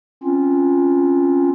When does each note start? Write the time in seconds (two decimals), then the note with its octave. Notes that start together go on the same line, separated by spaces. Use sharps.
0.23 C4 C#4 F4